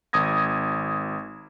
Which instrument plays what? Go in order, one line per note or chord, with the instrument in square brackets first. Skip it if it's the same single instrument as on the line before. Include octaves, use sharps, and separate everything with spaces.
[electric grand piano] G#1 D#6 G#6 A#6